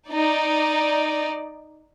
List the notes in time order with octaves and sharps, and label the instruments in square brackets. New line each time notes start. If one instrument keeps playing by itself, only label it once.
[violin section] D#4 D5